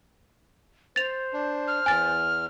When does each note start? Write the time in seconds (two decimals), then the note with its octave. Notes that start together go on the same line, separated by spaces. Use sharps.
0.96 C5 A6 F7
1.33 D4
1.68 F6
1.86 E2 G#5 A6